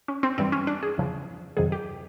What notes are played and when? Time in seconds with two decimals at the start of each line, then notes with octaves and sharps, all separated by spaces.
0.08 C#4
0.23 C4
0.38 G2 E3 G3 C4
0.52 C#4
0.67 D4
0.83 G#4
0.98 E2 C#3 F3
1.57 F2 C3 D#3 F#3 G#4
1.72 G4